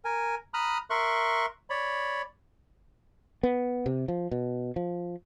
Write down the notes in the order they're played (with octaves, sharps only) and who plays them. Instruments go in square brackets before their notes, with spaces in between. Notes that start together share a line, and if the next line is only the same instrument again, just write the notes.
[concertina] A#4 G#5
A#5 B5 D#6 F6 F#6
A#4 E5 C6 C#6 F#6
C#5 D5 B5
[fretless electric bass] B3
C3
F3
B2
F3